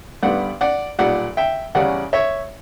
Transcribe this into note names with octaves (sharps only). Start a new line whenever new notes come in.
G2 D3 G3 B3 D5 F#5
D5 F#5
B1 A#2 G3 D5 F#5
E5 G5
E2 C#3 G3 C#4 D5 F#5
C#5 E5